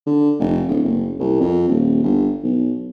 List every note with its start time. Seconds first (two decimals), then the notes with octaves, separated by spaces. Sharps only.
0.06 D3
0.39 F1
0.68 D1
0.83 F#1
1.19 C2
1.40 F2
1.69 D#1
2.03 G1
2.44 B1